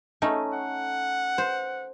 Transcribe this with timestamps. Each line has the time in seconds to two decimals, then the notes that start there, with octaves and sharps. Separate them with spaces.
0.22 A3 C#4 D#4
0.53 F#5
1.38 C5